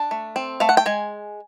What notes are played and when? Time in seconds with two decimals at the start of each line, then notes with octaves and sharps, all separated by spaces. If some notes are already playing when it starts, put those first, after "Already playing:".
Already playing: D4 A5
0.11 A3
0.36 C4
0.60 A3 F5
0.69 F#5
0.77 G5
0.86 G#3 G#5